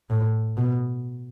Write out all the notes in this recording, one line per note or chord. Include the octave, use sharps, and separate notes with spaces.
A2
B2